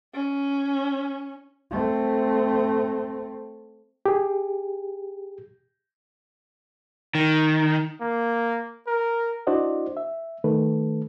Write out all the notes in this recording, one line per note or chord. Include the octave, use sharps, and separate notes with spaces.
C#4
A3 C4
G4 G#4
D#3
A#3
A#4
D4 E4 F#4 C5 D5 D#5
E5
D#3 A3 A4 B4